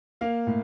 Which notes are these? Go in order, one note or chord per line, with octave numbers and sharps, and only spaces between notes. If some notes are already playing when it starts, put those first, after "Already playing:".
A#3 F5
A2